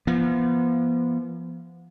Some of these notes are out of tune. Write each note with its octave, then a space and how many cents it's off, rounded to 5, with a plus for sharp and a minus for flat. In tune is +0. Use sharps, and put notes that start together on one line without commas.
F3 -35 B3 -35